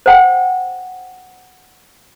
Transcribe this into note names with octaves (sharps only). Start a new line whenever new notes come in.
C5 F#5 G5